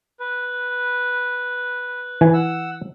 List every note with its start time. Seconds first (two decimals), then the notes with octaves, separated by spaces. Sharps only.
0.20 B4
2.21 E3 G#5
2.34 F#5 E6